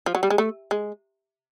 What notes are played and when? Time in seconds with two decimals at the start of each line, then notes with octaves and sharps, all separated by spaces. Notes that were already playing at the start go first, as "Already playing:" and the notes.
0.06 F3
0.15 F#3
0.23 G3
0.30 G#3
0.38 A3
0.71 G#3